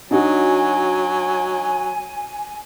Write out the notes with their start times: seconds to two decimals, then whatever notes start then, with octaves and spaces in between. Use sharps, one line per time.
0.11 F#3 D4 D#4 F#4 G#5